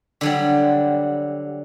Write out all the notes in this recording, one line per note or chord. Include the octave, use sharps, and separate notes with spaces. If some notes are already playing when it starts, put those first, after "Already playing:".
D3 F#3 G3